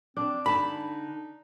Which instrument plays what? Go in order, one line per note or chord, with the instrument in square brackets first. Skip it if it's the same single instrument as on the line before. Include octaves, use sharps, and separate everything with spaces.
[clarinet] C4 [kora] D4
[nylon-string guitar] D3 G#5 A5 [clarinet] D#4 [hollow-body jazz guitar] B5